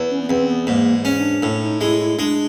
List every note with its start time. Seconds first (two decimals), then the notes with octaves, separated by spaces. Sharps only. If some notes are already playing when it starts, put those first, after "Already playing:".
Already playing: E2
0.11 C#4
0.22 B3
0.29 E2 C4
0.49 B3
0.67 G#2 A#3
1.05 C#4
1.18 D4
1.43 A2
1.62 D#4
1.81 G#3 E4
2.00 E4
2.18 G#3 D4